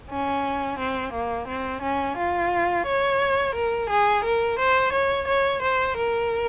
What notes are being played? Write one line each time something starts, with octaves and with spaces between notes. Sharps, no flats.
C#4
C4
A#3
C4
C#4
F4
C#5
A#4
G#4
A#4
C5
C#5
C#5
C5
A#4